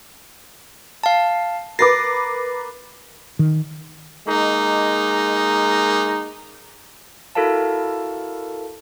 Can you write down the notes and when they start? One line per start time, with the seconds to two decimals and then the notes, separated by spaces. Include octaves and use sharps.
1.03 F5 A5
1.79 A#4 B4 D6 A6 A#6 C7
3.39 D#3
4.28 G#3 A#3 D#4
7.35 E4 F#4 A4 A#4 F5 A5